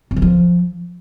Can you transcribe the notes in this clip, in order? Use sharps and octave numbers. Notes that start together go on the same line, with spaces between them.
C#4
E3
F3